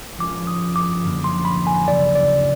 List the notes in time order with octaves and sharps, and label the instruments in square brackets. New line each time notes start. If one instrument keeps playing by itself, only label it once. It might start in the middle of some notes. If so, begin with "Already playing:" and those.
[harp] F3 G#3 C#4 F4 A#4 [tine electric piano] D6
[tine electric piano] D#6
D6
[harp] F#2 D3 F3 A#3
[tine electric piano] C6
B5
G#5
[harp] D2 C#3 F#3 [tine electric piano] D5
[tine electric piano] D5